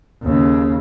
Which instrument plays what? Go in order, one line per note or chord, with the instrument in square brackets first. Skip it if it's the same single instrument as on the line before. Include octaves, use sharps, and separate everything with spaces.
[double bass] D#2 C#3